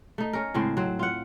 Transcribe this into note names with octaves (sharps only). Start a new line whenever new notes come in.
A3 D#4
C#4 A#4
A2 C#3 G#3 C4
F#3 C4
F4 F#5